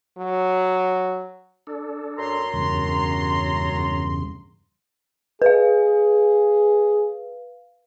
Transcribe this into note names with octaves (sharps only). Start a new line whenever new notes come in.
F#3
D4 A4
F#2 A#5 C6
E2 G2 C#3
G#4 B4 F5